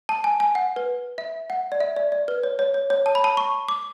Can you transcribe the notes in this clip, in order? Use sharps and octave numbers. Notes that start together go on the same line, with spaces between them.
A5
G#5
G#5
F#5
B4
E5
F#5
D5
E5
D5
D5
B4
C#5
C#5
C#5
C#5
A5
B5
A5
C#6
D6